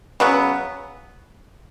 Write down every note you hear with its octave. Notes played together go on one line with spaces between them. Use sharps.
C#3 F#3 B3